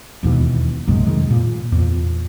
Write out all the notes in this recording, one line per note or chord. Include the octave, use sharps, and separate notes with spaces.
E1 D#2 B2 E3
A#1 F#2 C3 G#3
F2 D#3 G#3
A#2
E2 A#2